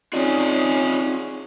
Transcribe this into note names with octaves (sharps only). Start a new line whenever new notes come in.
C4 C#4 D#4 F4 G#4 D5